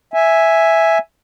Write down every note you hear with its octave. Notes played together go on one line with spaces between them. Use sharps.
E5 G#5